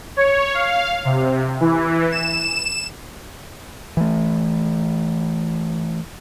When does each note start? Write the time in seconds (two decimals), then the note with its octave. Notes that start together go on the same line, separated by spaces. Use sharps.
0.17 C#5
0.54 F5
1.05 C3
1.61 E3
2.12 E7
3.97 E3 A3